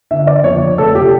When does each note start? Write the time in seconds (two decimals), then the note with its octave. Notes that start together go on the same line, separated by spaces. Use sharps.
0.11 D3 E5
0.27 D5
0.44 F2 C#5
0.78 F1 A4
0.95 G4